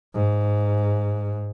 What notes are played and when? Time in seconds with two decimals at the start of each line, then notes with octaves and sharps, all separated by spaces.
0.14 G#2